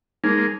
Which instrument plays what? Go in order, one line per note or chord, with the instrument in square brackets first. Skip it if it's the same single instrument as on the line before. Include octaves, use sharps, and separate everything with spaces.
[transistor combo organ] G#3 A#3 [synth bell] D#4
[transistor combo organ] A#3